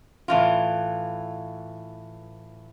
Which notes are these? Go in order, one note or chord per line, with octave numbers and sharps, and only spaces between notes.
A2 E3 F4